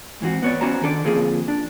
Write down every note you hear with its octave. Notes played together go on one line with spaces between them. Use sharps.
G#2 E3 C4 F#4
B3 C#5 D5
C#4 E4 F#4 C5 A#5
D#3 D4 A4 D5
D3 F3 A#3 C4 G#4 A4
D4